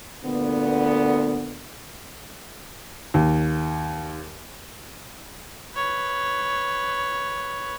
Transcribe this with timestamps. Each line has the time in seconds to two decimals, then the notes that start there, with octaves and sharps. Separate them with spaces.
0.25 D2 A#2 D3 B3
3.14 D#2
5.76 B4 C#5